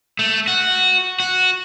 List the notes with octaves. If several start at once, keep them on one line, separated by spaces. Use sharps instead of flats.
A3
F#4
F#4